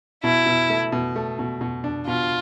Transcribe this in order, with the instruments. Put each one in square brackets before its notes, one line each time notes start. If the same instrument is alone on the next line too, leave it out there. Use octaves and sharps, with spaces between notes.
[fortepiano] B2 [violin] E4
[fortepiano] B2
A3
B2
A3
B2
B2
D4
[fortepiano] B2 [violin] F4